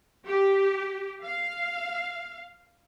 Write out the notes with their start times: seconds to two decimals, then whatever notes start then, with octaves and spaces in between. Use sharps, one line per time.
0.26 G4
1.24 F5